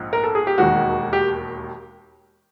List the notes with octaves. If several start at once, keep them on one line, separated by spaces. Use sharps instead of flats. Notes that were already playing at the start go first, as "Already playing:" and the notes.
Already playing: A#1 G#2 F3
A#4
A4
G#4
G4
E1 D#2 D#3 G#3 F#4
G4